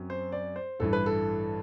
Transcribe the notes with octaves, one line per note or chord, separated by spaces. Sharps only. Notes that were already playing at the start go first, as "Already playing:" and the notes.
Already playing: F#2 F#3 C4
C5
D5
C5
A1 G2 E3 A4
B4
A4